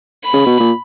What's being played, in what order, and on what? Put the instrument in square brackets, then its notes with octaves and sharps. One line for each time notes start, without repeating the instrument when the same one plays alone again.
[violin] B5
[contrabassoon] C#3
B2
A#2